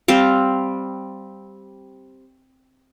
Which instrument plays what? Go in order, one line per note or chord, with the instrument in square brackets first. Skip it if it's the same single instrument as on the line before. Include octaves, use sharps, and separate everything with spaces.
[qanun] G3 C4 F5